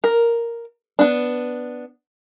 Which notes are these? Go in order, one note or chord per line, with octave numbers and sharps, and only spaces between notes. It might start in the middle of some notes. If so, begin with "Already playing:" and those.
A#4
B3 D4